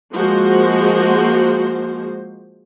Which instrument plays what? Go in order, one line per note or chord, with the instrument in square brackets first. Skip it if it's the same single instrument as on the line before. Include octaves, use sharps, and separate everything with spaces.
[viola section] F3 G#3 A#3 F#4 C5